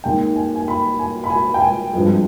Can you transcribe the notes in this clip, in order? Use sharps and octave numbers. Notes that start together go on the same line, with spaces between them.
D#2 D#3 G#3 G5
G#5
G#5
B5
G#5
B5
G#5
G5
G#5
G#1 G2 F3 G#3